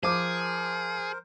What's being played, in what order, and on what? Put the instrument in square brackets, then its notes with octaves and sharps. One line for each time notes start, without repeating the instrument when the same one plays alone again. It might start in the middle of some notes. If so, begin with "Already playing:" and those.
[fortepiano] F3 D6 [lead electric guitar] G#4 [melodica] A#4 C5